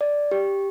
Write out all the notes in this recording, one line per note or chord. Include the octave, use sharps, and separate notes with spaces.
D5
G4